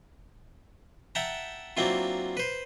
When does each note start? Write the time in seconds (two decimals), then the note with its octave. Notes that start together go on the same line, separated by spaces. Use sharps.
1.15 E5 F#5 G5 A5 A#5
1.77 F#3 A#3 C4 D4 E4 F4
2.37 B4 C5